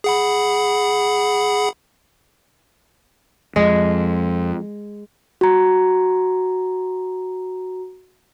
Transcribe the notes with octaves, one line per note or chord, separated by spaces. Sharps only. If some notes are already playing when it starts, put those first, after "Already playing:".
G#4 F#5 B5
F2 G#3
F#4 A#5